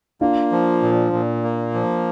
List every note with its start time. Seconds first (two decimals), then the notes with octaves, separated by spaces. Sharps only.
0.21 A#3 D4 F4
0.52 F3
0.83 A#2
1.13 A#2
1.44 A#3
1.74 F3